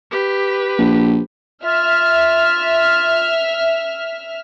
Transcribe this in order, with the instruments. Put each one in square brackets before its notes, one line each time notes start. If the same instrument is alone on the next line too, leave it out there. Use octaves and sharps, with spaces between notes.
[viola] G4 B4
[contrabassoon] A#1
[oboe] F4 [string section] E5 F6